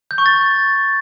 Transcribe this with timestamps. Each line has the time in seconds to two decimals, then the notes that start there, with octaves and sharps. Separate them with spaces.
0.11 G6
0.18 C#6
0.26 A6